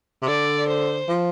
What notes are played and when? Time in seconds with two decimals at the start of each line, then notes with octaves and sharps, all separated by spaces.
0.22 C3
0.28 D3 D5
0.68 C5
1.09 F3